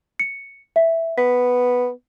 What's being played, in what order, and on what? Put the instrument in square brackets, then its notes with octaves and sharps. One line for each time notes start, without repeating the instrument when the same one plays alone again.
[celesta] C#7
E5
[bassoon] B3 [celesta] B6